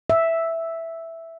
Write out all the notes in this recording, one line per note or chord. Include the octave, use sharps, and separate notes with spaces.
E5